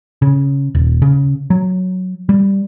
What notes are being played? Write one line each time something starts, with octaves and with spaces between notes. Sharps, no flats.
C#3
D#1
C#3
F#3
G3